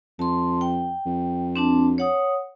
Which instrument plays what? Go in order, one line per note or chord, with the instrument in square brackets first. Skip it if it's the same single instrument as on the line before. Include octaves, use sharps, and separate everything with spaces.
[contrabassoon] F2 [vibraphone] A5 C6
[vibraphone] G5
[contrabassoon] F2
[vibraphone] C4 D4 A5
C#5 F#5 D#6